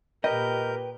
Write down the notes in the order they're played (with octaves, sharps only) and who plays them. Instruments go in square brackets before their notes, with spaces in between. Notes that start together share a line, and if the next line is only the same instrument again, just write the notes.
[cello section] A#2 G4 [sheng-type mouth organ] A#4 G6 [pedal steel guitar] B4 G5 [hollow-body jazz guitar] D#5